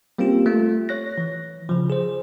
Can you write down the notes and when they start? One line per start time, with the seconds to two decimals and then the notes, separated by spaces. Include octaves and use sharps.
0.18 G3 A#3 C4 C#4 F4 G4
0.46 A3 F4
0.89 C#5 F#6 A#6
1.18 E3
1.69 C#3 F3
1.90 G#4 C5